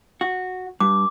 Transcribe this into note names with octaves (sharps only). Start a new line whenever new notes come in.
F#4
G2 D6